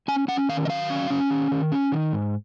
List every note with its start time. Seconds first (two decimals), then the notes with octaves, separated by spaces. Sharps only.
0.08 C#4 G#5
0.28 C#4 F#5
0.49 D#3 F5
0.65 D#5
0.69 F#3 F5
0.90 C#4
1.10 C#4
1.30 D#3
1.51 D#3
1.72 C#4
1.92 D#3
2.13 G#2